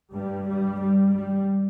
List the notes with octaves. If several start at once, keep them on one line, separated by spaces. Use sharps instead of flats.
G2 G3
G3
G3
G3